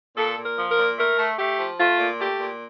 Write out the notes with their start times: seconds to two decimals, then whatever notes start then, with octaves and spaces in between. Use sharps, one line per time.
0.16 A#2 A4
0.38 A#2
0.44 A#4
0.58 F3
0.70 A#4
0.78 A#2
0.98 A3 A#4
1.19 A3
1.38 A3 G4
1.59 F3
1.78 A3 F4
1.99 A#2
2.19 A3 G4
2.40 A#2